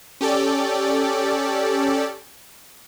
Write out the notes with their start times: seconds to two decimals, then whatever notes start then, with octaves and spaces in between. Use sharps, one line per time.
0.21 C#4 G4 A4 D5